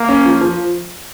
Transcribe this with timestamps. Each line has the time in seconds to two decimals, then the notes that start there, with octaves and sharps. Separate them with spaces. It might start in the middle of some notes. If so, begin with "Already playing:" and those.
Already playing: A#3
0.09 C#4
0.26 F3
0.41 F3